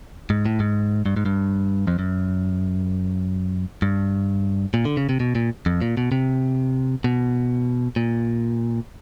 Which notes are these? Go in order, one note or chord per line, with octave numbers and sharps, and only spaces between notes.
G#2
A2
G#2
G2
G#2
G2
F2
F#2
G2
A#2
D3
C#3
C3
B2
A#2
F2
A#2
B2
C3
B2
A#2